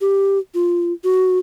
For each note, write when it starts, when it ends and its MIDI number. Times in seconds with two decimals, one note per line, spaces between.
0.01 0.38 67
0.54 0.93 65
1.04 1.38 66